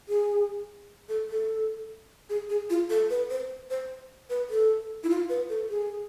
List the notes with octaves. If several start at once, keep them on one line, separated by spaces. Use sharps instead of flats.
G#4
A4
A4
G#4
G#4
F4
A4
B4
C5
C5
B4
A4
E4
F4
B4
A4
G#4